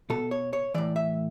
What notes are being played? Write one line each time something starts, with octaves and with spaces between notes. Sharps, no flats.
B2 A4
C#5
C#5
A2 E3 D5
E5